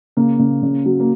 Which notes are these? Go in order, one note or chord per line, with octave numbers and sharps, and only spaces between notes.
C#3 A#3
C#3
C#3
F#3
A#3